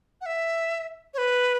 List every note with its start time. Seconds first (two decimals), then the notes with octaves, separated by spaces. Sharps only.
0.21 F#5
0.26 E5
1.14 C#5
1.18 B4